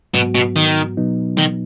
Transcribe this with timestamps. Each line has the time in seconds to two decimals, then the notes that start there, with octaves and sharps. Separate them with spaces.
0.14 G#2 B2 F#3 B3 F#4
0.35 B2
0.56 D#3
0.97 B2 F#3 B3 D#4
1.38 D#3